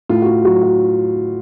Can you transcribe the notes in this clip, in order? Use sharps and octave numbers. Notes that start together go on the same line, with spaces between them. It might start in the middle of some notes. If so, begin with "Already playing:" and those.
A2 F4
F#4
F4
F#3 F#4
F#4